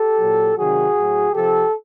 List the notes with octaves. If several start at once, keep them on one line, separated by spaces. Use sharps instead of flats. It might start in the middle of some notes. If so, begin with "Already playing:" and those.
Already playing: G4 A4
A#2 F#3
C3 D#3 F#3 F#4 G#4
A2 F#3
C3 F3 G4 A4